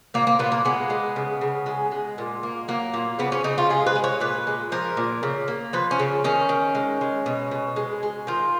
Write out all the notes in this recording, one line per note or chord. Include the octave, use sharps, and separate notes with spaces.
A#2 A#3
A#3
A#2 B3
A#3
G#3 B3
G#3
C#3
C#3
G#3
G#3
A#2
A#3
F#3 A#3
A#2
C#3 B3
C#4
C#3 D#4
F4
G#3 G#4
B4
G#3
C#5
A#2 B4
G#3
F3 A#4
A#2
C#3
A#3
F3 B4
C#4
C#3
D#3 C#4
D#3
G#3
G#3
B2
B2
G#3
G#3
D#3 F4